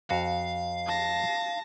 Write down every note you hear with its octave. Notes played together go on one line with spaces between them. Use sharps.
F2 F#4 F5
A5 A#6